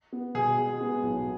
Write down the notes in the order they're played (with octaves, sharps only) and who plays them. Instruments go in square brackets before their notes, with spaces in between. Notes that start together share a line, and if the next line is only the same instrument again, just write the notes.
[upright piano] B3
[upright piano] B2 [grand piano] G#4
[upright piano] G#3
B3
B1